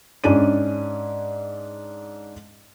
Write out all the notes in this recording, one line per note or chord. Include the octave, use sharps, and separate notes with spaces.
G#2 C#4 D4 G#4 D5 D#7